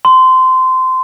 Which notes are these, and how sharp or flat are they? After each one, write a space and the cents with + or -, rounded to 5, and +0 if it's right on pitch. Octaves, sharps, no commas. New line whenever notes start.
C6 -20